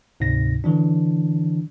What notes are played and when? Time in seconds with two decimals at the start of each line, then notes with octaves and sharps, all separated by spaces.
0.20 D2 G#2 C3 D#4 A#6
0.64 D3 E3 F#3 D4